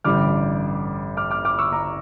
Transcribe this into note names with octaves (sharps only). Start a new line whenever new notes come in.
A1 G2 D3 G3 D6 F6
D6 F6
D6 F6
D6 F6
C#6 E6
A#5 D6